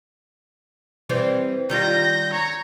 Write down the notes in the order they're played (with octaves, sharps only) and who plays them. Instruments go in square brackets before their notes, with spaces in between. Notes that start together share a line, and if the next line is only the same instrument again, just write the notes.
[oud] E3 G3 C4
[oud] D#3 G3 F4 [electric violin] G6 A#6
[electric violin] C#5 A#5